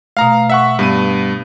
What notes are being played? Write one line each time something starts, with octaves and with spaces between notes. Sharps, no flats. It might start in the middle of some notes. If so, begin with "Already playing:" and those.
B2 A3 F5 A#5
E5 F#5 C#6
G2 B3 D#7